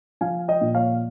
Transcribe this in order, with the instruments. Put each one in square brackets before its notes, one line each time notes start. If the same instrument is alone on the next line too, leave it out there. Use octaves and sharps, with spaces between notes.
[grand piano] F3 F5 G#5
D#5 G5
A#2
C#5 F5